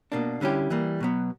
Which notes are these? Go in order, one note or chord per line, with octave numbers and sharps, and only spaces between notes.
B2 A#3 D4
D3 G3 C#4 E4 G4
E3 G3 A#3
B2 F#3 B3